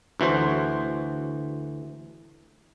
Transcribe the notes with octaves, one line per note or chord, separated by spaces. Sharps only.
D2 E3 F#4 C5